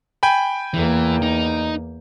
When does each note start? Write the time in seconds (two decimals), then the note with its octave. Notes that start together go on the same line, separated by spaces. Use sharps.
0.23 G5 G#5 B5
0.74 E2 E3 A#3
1.22 D#4